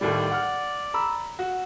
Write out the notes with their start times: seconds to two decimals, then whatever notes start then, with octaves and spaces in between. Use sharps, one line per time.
0.01 D#2 A2 G3 D5
0.31 F#5 F6
0.94 A#5 B5 E6
1.39 F#4